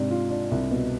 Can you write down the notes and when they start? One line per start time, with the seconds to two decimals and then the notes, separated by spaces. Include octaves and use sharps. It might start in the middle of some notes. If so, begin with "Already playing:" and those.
Already playing: G#2 C3 D4
0.11 F4
0.30 D4
0.51 C2
0.71 B2